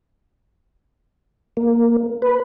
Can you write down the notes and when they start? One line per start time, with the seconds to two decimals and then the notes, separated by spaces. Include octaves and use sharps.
1.57 A#3
2.22 B4